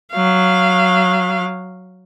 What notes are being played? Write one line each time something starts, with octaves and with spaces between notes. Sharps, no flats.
F#3 F5